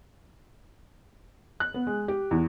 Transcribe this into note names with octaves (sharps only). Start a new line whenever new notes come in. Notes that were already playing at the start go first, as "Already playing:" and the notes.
F#6
B3
G#3
G4
E2